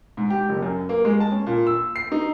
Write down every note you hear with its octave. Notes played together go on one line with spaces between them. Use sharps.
G#2
G4
F#1
F#2
A#3
G#3
A5
C#4
A#2
E6
C7
D#4